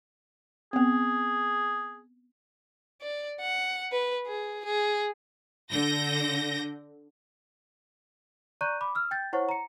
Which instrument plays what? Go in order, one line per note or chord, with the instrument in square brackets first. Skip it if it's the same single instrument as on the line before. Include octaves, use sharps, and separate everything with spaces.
[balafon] B3 C4 [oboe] G#4
[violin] D5
F#5
B4
G#4
G#4
[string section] D3 G6 A#6
[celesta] D5 A#5 C#6 F#6 G6 D#7
B5 D6
E6 F6
G5 G6 A6
E4 C5 C#5 F#5 C#6
A#5 C#7